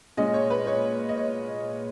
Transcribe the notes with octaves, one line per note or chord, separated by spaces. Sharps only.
A#2 G#3 C#4 D#5
C#5
B4
C#5
D#5
C#5